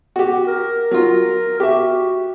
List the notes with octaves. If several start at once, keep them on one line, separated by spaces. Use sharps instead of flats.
F#4 G4
A#4
F#3 F4
F#4 G4 E5